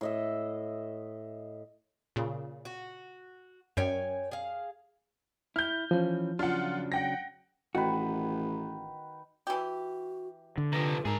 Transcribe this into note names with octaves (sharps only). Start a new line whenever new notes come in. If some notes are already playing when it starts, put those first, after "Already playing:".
A2 D#5 E5
A#2 C#3
F#4
F#2 C#5 G5 G#5
G#4 F5
E4 F6 G6
E3 F3 C#4
C#3 F#3 D4 F4 F#5
F#5 G5 A#6
A1 D#3 F#4 B4
E3 F#4 G4
D3
C3 F3 B4
G#2 D#4 G#4 A#4